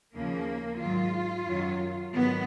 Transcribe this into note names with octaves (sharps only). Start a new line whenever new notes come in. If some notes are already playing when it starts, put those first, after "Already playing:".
D#2 C#3 F3 A#3
G#2 D#3 F#3 F4
F#2 D#3 F#3
G#2 D#3 F#3 B3